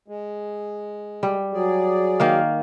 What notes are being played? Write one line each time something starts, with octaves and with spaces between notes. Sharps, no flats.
G#3
G3
F#3 G#4 D5
D#3 A#3 F5